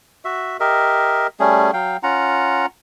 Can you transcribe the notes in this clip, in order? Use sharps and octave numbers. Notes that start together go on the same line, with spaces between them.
F#4 E5
G4 A#4 D#5 E5
G3 A3 C#4 G#4
F#3 F5 G5
C#4 F4 F#5 A#5